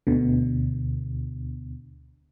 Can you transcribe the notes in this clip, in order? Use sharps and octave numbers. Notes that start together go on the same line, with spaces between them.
D2 B2 D3